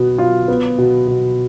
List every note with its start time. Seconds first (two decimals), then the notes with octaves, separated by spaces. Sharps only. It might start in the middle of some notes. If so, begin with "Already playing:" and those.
Already playing: B2 B3
0.18 F4
0.48 B3
0.78 B2
1.08 B2